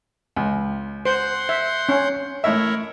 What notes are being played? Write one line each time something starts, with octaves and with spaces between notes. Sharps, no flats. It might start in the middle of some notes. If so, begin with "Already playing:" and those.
C#2
C5 F#5 C6 G6
E5
C#4
A2 E4 A#4 C#5 E5